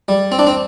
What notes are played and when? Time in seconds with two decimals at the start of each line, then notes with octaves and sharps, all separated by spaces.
0.08 G3
0.32 C4
0.39 D4
0.47 C4